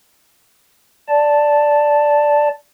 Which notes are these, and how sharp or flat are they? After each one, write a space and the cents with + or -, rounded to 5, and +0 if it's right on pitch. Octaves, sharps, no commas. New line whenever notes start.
D5 +0 A5 +5